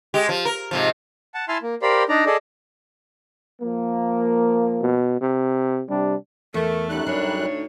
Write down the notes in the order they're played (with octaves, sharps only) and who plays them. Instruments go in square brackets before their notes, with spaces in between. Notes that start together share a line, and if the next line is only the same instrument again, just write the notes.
[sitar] G#3 G4
F3
A#4
G#2 C3 F3
[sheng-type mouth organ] F#5 A5
E4 E5 G#5 A5 C6 F6
A#3
G4 A#4 C5 D5 F5 B5
D4 D#4 D5 A#5
G#4 A4 D5 D#5
[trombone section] F3 A#3
[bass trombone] B2
C3
[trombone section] C3 G3 D4
[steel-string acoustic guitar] E2 [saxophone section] A3 [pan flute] A#4
[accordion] F#2 G3 F#6 [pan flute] D#4
[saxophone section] D2 A2 C#5 [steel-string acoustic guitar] D4